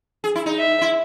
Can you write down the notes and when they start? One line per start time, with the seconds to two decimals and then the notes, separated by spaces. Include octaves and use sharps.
0.24 G#4
0.35 E4
0.46 D#4
0.58 E5
0.81 E4